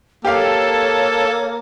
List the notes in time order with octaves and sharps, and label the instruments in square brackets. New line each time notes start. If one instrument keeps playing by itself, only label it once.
[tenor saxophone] A#3 [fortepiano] G4 F5 [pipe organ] A4 [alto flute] C#5